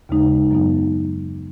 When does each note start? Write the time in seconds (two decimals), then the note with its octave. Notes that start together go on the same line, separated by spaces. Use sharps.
0.09 D#2 C#3 G#3 D#4
0.51 F#2 F#3 B3 D#4